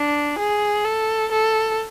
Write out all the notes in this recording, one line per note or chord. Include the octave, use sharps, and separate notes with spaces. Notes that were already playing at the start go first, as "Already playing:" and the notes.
Already playing: D4
G#4
A4
A4